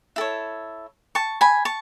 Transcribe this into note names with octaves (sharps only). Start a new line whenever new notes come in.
E4 A4 C#5
A5 C#6
G#5 B5
A5 C#6